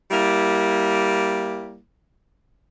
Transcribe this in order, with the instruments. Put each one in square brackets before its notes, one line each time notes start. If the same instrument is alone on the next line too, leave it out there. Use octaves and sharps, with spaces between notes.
[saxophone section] G3 A#3 E4